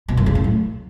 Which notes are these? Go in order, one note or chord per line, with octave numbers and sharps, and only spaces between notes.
B2
F#2
C#3
A2
F#3